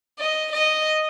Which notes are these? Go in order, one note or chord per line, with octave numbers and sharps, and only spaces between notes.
D#5
D#5